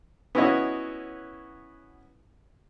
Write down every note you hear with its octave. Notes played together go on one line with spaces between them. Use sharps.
B3 C#4 E4 F#4 C#5 D#5